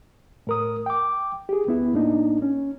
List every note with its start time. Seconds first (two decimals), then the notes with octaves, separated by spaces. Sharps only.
0.47 A2 A#4 D#6
0.86 G5 D6
1.49 G4 G#4
1.67 D2 B3 E4
1.93 A2 A#3 D4 D#4
2.42 C#4